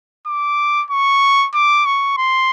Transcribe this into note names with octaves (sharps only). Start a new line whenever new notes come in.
D6
C#6
D6
C#6
C6